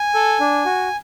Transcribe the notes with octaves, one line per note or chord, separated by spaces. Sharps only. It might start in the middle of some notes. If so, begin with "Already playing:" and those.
Already playing: G#5
A4
D4
F#4